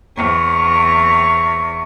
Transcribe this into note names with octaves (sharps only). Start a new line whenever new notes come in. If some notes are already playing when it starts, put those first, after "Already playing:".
E2 C#5